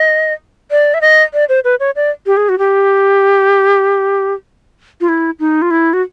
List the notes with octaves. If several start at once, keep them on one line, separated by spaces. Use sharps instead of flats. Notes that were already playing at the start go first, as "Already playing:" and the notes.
Already playing: D#5
D5
E5
D#5
D5
C5
B4
C#5
D5
G4
G#4
F#4
G4
F4
E4
D#4
F4
E4
F#4